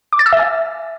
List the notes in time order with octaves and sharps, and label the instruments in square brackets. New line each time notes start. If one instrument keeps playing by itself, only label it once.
[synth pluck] D6
A6
E6
E5
G#5